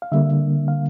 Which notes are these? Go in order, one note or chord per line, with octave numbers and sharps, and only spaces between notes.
F5
D3 G3 A#3 E5
F5